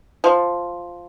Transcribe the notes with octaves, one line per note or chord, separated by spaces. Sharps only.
F3